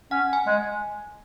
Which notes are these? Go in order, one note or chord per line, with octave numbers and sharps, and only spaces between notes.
C#4 F#5
G#5
G#3